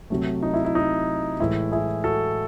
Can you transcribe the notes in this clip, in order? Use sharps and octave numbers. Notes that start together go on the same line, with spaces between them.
C3 F#3 A3
D#4
E4
E4
D#4
A2 E3 G#3 E4
E4 G#4
F#4 A4